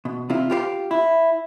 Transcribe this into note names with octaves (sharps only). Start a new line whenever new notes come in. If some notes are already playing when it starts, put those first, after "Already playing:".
B2
C3 C4 E4 F4
F4 G4 A#4 F5
E4